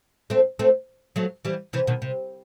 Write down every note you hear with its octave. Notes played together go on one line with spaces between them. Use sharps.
A3 C4
A3 C4
F#3 A3
E3 G3
C3 E3
B2 D#3
C3